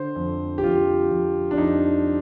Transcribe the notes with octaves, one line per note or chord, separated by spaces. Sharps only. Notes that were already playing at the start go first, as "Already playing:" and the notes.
Already playing: D3 C5
F2
G4
F2 F4
F2
D4
F2 D#4